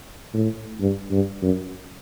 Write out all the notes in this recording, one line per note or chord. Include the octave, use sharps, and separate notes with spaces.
A2
G2
G2
F#2